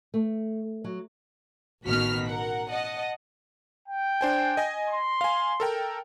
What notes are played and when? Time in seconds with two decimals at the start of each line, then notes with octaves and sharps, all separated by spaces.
0.14 A3
0.84 F#3
1.86 A1 B2 D#3 F#4 F6 B6
2.28 A#4 F#5
2.69 D#5 F#5 A5
3.88 G5
4.21 D4 C5 G#5
4.57 D#5 G#5 A#6
4.88 C6
5.21 F5 G#5
5.60 A4 A#4 G5